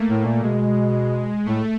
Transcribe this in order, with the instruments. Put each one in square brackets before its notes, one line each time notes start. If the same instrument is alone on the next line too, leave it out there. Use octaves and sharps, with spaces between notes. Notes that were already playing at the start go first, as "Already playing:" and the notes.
Already playing: [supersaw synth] A3 A#3
[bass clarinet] A2
A#2
[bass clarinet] B2 [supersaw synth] G#3
[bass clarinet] A2 [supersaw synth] A3